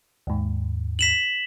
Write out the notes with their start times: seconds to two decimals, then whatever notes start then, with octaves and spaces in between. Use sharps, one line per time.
0.27 D#2 G#2
0.99 B6 E7 F#7